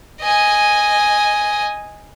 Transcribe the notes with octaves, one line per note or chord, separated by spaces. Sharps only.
D#5 G#5